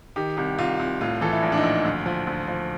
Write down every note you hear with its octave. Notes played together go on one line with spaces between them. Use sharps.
D#3 G4
C2 G4
C2 F4
C2
A2 F4
E3 A4
E4
A#1
D4
D#4
A#1
D2
F3
D2
F3